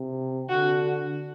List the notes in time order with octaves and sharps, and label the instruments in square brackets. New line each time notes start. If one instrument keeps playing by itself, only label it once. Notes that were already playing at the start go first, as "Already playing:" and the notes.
Already playing: [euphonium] C3
[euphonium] D3 [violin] F#4